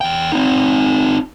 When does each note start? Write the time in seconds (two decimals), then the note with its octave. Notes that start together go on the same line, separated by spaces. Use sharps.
0.01 E2 G5
0.32 C4 D#4